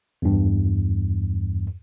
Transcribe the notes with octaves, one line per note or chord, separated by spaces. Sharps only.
E2 G2